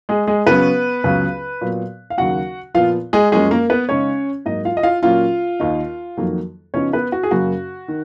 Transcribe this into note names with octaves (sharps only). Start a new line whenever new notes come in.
G#3 G#4
G#3 G#4
C#3 F#3 B3 C#4 B4
C#2 C#3 F#3 B3
A#2 F#3 B3
F5
D#2 C#3 F#3 A#3 F#4 F#5
A#2 F3 B3 F4 F5
G#3 G#4
F#2 F3 G#3 A#3 C#4 G#4
A#3 A#4
B3 B4
C#3 G#3 C#4 D#4 C#5
G#2 F#3 A#3 D#4 D#5
F4 F5
D#5
F4 F5
A#2 F#3 A#3 C#4 F4 F5
D#2 D#3 A#3 D#4
F2 D#3 F#3 A#3
C#3 F3 B3 C#4 D#4 C#5
B3 B4
F#4
G#4
F#2 C#3 F#3 A#3 F#4
D#3